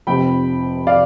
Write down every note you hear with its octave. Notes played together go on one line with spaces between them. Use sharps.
F1 F2 C3 G5 B5
D5 F5